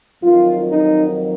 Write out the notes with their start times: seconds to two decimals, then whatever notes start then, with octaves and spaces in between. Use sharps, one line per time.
0.22 F2 D#3 F#3 F4
0.69 D#4